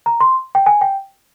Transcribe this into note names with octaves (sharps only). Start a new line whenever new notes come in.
A#5
C6
G5
G#5
G5